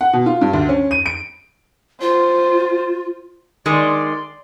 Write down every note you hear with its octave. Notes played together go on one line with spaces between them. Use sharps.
F#5
B2
F4
G2
D2
C#4
D#7
D7
F4 C5
D#3 G#3 D5 C6